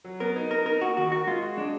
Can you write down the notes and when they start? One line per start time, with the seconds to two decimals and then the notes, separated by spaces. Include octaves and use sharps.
0.04 F#3
0.20 B3 A#4
0.36 D#4
0.51 B3 A#4
0.66 D#4 A#4
0.81 A#3 F#4
0.97 D#3 F#4
1.11 F#4 A#4
1.27 G#3 F4
1.42 F#4
1.57 G#3 D4